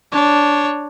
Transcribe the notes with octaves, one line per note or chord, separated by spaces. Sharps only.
D4 C#5